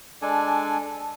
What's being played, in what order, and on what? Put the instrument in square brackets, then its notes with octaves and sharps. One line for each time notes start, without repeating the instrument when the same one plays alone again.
[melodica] G#3 D4 A4 G#5